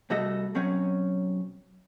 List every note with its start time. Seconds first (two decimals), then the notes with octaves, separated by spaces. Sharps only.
0.10 C2 G3 A3 F#4 A4 D#5
0.55 B1 F#3 C4 C#4 C#5